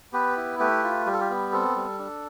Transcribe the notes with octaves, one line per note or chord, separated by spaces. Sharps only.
B3 G4 B4
E4
A3 G4 B4
F4
G3 G4
A4
G4
B3
C4 A4
G3
D4